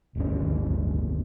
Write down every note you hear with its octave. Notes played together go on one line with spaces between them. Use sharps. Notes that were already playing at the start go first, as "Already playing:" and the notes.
D1 G1 C#4